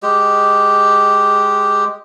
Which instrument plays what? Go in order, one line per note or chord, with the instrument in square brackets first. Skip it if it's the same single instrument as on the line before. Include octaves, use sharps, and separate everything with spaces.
[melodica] G#3 G4